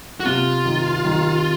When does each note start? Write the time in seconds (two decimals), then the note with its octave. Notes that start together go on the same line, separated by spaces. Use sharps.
0.20 F#4
0.25 C3 F4
0.65 D#3
1.05 D#3